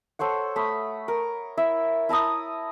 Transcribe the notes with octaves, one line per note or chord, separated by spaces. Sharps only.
A4 C5 C#5 F#5
A3 B5 D#6
A#4
E4 E5
E4 A5 A#5 D#6